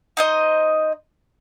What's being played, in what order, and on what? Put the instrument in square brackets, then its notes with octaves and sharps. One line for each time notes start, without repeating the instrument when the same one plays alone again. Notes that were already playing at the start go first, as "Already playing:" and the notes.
[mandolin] D#4 C5 D#5